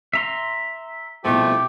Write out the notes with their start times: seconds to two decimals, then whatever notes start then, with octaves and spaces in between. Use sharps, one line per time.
0.14 E5 A#5 C6
1.25 C2 B2 F3 A3 G4